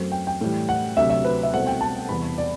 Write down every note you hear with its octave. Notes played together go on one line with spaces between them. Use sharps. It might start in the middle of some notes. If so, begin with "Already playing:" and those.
Already playing: F#2 F#3 A3 C4
G5
G5
A2 E3 G3
F#5
D2 C3 F#3 E5
E5
B4
E5
C2 B2 A3 C4 F#5
G5
A5
E2 C3 G3 B3 B5
D5